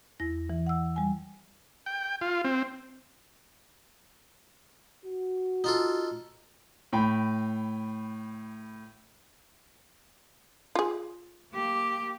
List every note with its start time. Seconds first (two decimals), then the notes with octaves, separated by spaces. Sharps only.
0.20 E2 E4 A#6
0.50 E3
0.67 F#5 E6
0.96 G3 G#5
1.86 G5
2.21 F4
2.45 C4
5.05 F#4
5.64 D#4 F4 A4
6.93 A2 G5 B5
10.75 F4 G#4
11.52 A#3 G4